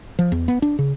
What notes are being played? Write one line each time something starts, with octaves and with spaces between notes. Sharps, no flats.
F3
E2
B3
D4
C#3